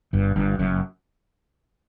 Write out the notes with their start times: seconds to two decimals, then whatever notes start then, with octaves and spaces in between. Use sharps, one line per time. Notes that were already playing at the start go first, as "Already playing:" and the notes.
0.13 G1 G2
0.36 G1 G2
0.59 F#1 F#2